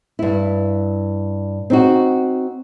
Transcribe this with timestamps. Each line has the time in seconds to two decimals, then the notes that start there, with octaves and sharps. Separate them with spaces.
0.19 G2 E4
1.70 C4 D#4 F#4